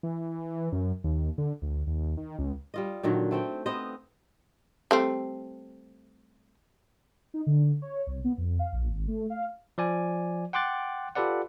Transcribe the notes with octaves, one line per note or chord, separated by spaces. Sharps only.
E3
F#2
D#2
D3
D2
D#2
D#3
C#2
G3 F4 D#5
A#2 D3 D#3 F#3
A3 C4 G5
B3 C4 C5 D#5
G3 A3 C4
D#4
D3
C#5
C2
B3
F2
F5
A#1
G#1
A3
F5
F3 D5 G#5
F#5 G5 C6 D6 F#6 A6
F4 G4 A4 B4 D5 F#5